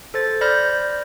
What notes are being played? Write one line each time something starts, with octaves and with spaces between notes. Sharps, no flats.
A4 C5 A6
C5 D5 B5 F6 G6 A#6